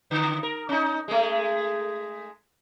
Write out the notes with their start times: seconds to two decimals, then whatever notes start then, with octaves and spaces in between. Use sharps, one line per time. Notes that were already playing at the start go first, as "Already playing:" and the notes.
0.11 D3
0.43 A#4
0.69 C#4 D#4
1.08 G#3 A3